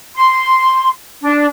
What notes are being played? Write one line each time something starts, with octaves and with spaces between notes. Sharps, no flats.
C6
D4